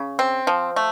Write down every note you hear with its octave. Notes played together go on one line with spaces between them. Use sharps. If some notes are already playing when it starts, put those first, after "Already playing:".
Already playing: C#3
C4
F3
A3